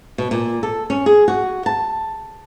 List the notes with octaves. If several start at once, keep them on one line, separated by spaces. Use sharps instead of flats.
B2
A#2
A4
C#4
G#4
F#4
A5